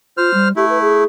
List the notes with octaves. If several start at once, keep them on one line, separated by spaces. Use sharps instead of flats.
F4 C5 F6
G3
A3 E4 G4
B4
G#4